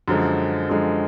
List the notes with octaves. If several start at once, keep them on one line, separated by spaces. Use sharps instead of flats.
F#2 D3 F3 G#3
F#2 D3 F3 G#3